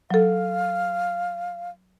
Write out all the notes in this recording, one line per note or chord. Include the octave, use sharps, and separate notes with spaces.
F#3 A4 F5